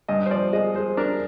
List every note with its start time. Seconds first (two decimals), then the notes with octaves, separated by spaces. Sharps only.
0.08 G2 D#5
0.26 C5
0.31 F3 D5
0.53 G#3 D#5
0.75 G#3 C5
0.97 D4 A#4